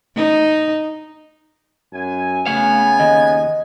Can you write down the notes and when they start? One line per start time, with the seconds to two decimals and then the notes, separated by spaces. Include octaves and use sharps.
0.16 D#4
1.93 F#2 G#5
2.46 C#3 A3 B3 F5 G#5 C#7
3.00 D#2 D#5